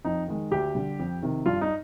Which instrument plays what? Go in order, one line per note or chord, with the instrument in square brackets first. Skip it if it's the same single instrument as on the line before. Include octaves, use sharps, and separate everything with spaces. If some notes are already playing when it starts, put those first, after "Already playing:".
[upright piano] F2 D#4
D#3 G#3
D2 G4
D3 G3
F2
C3 D#3
G2 F4
D#4